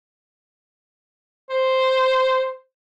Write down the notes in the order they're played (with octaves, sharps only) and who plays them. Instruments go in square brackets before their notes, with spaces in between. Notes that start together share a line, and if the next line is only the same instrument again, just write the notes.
[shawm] C5